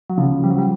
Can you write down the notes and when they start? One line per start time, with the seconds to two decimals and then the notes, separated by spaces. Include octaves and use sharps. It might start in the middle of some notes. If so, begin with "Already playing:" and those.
0.10 F#3
0.18 C#3 F3
0.43 F3 G3
0.50 F#3
0.58 G3